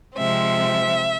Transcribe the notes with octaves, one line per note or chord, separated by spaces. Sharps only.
C3 F3 G#3 C4 E5